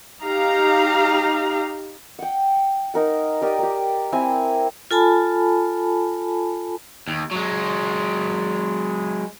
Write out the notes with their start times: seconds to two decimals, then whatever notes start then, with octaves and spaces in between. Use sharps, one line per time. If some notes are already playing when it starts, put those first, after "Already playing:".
0.23 D#4 G4 F5 A#5
2.19 F#5 G5
2.94 D#4 A#4 F#5
3.41 G4 A#4 D5 D#5
3.59 G4 A#4
4.12 C4 E4 G#5 A#5
4.91 F4 A4 G#5 A5 B5
7.08 D#2
7.31 F#3 G#3